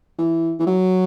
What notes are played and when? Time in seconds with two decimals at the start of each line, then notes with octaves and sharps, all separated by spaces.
0.19 E3
0.60 E3
0.67 F#3